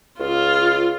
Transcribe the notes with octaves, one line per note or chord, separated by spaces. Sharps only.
C#2 F4